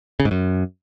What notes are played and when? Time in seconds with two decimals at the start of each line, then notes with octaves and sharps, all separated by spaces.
0.20 C#3
0.25 G#2
0.31 F#2